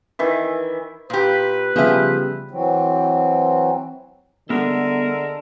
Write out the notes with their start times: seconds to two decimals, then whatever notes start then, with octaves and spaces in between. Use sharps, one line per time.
0.19 D#3 E3 E5
1.10 A#2 G4 B4
1.76 C#3 F3 G3 B3 G4 G#4 E5
2.51 E3 F#3 C4
4.49 D3 G3 G#3 B3 A4 A#4 E5